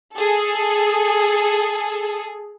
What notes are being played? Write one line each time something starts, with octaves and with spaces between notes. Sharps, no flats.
G#4 A4